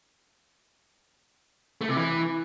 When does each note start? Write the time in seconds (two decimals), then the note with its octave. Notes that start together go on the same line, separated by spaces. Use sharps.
1.81 A3
1.89 C3
1.96 E3